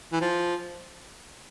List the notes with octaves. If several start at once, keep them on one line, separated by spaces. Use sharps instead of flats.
E3
F3